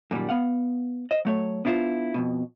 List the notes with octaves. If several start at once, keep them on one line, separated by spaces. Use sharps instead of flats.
F#2 A#2 D#3 G3
B3 F5 F#5
C5 D#5
F#3 A3 C#5
B3 D4 E4 F4 C5
F2 G#2 B2